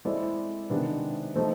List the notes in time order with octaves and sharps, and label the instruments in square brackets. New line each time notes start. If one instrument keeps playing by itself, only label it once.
[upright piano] G#3 C4 E4 A4 D5
C3 D#3 G#3 B3 D4
F3 A3 C4 D#4